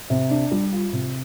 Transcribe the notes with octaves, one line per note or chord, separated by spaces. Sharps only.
C3
D4
G3
F4
C3